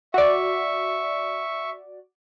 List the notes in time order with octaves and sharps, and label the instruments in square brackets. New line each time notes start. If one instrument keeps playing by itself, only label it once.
[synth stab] F#4 D5 [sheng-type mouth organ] E5 C#6